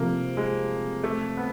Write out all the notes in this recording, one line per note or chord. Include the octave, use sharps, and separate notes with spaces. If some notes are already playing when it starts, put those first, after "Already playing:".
Already playing: C3 F3 A3 A#3
G#3
A3
B3